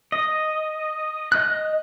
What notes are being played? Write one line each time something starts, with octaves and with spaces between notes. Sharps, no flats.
D#5
D#5 F#6